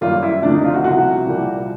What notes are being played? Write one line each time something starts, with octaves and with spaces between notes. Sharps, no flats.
F#2 D#3 G3 A#3 F4
E4
D2 C3 F3 D4
D#4
F4
F#4
C2 C3 F3 F#4
C2 A#2 G3 A#3